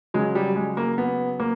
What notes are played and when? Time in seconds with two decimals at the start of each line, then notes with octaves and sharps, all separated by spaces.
0.14 C#3 F#3 G#3
0.35 G3
0.56 G#3
0.77 A#3
0.98 B3
1.40 A#3